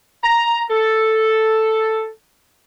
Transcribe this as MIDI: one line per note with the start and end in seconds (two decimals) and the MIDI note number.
0.24 0.63 82
0.71 2.09 69